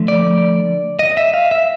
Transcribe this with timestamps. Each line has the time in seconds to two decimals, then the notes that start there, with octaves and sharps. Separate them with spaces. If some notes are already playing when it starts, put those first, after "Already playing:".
Already playing: D3 F3 A3
0.08 D5
0.99 D#5
1.17 E5
1.34 F5
1.51 E5